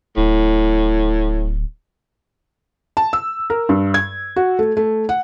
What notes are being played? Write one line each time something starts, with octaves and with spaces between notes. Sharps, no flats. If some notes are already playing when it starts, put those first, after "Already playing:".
D1 A2
A5
E6
A#4
G2
G#6
F#4
A3
A3
F#5